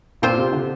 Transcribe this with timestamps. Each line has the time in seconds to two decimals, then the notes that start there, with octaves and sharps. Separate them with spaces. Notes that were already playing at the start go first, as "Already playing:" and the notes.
0.22 A#2 C4 F4 C5
0.38 C3
0.53 D3